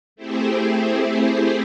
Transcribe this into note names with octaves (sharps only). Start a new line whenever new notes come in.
A3 C4 E4 G4 G#4 C5